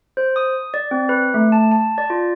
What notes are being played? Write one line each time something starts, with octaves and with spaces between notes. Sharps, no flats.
C5
D#6
D5
C4
B4
A3
A5
A5
D5
F4